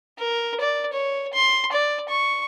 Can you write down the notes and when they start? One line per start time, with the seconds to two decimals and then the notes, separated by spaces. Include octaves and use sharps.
0.19 A#4
0.61 D5
0.93 C#5
1.33 C6
1.72 D5
2.09 C#6